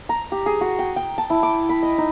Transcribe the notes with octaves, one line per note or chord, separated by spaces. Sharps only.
A#5
G4
G#4
F#4
G5
G5
A5
E4
D6
B5
D#5
D#4